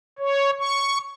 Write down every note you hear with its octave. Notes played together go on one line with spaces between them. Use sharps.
C#5
C#6